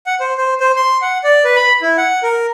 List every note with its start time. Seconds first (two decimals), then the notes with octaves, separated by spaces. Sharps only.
0.06 F#5
0.20 C5
0.38 C5
0.60 C5
0.76 C6
1.02 F#5
1.24 D5
1.44 B4
1.56 B5
1.82 E4
1.98 F#5
2.23 A#4